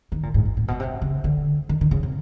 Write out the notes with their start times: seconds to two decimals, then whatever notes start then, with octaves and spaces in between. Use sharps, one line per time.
0.12 D#3
0.23 A#2
0.34 G#2
0.45 G#2
0.57 A#2
0.68 B2
0.80 C3
1.02 C#3
1.24 D3
1.69 D#3
1.81 D#3
1.91 C#3
2.03 C3